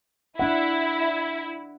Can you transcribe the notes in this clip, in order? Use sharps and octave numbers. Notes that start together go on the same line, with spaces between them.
D4 E4 F#5